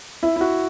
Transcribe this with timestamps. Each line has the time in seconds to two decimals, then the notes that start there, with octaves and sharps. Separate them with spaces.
0.23 E4
0.36 E4
0.41 F#4